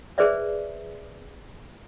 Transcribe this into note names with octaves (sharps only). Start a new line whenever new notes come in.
G#4 B4 C5 D5 E5